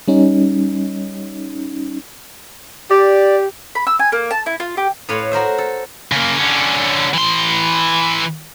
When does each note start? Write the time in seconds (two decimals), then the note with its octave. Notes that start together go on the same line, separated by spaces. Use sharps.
0.08 G3 C#4 D#4
2.91 G4 D5
3.75 B5
3.87 E6
3.99 G#5
4.12 A#3
4.31 A5
4.46 E4
4.60 F4
4.77 G4
5.09 A2 B4 C#5 F5 C6
5.31 F#4 A#4 C5 E5
5.58 A4
6.12 C#3 A#3
6.38 D3 C#4
7.14 E3 C6